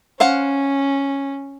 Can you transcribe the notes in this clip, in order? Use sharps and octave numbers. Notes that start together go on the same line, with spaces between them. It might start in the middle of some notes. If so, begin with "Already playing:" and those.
C#4 C5 F5 F#5